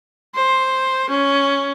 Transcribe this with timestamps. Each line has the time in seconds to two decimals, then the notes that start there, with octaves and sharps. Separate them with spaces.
0.35 C5
1.10 C#4